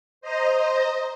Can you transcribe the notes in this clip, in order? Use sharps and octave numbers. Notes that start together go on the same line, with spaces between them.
C5 D#5 A#5